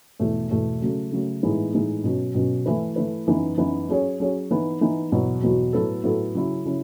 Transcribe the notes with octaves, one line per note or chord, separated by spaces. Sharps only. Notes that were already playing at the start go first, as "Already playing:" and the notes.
E2 B2 A3
E2 B2 A3
C#3 F#3 A3
C#3 F#3 A3
A2 E3 G#3 B3 D#4
A2 E3 G#3 B3 D#4
B2 F#3 C#4 F#4
B2 F#3 C#4 F#4
E3 A3 E4 B4
E3 A3 E4 B4
F#2 E3 B3 D#4
F#2 E3 B3 D#4
F#3 C#4 G#4 C#5
F#3 C#4 G#4 C#5
E3 B3 D#4
E3 B3 D#4
E2 B2 F#3 B3 F#4
E2 B2 F#3 B3 F#4
A2 F#3 B3 F#4 A4
A2 F#3 B3 F#4 A4
C#3 F#3 C#4 E4
C#3 F#3 C#4 E4